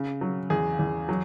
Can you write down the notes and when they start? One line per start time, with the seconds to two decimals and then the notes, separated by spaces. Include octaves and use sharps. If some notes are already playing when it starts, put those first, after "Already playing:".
Already playing: C#3
0.21 F#3
0.50 E2 G#4
0.79 E2
1.09 F#3